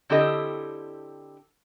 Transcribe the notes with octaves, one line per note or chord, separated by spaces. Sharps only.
D3 C4 E4 G4 A4 D#5